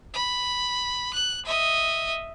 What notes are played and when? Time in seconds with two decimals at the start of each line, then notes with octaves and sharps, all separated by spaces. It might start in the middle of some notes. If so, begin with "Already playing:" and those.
0.14 B5
1.13 F#6
1.46 D#5 E5